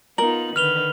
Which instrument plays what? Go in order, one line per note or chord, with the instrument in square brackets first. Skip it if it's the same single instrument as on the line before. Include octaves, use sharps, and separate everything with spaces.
[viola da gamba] B3 D#4 F4 [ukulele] A#4 [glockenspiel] F#7
[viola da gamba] D3 D#3 B4 [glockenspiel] F6 F7 G7